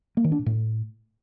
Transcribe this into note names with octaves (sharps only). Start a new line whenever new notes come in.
A#3
D#3
D4
A#2
A2